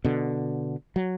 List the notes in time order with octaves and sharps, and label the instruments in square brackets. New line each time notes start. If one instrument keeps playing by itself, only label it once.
[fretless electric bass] B2 D3
F#3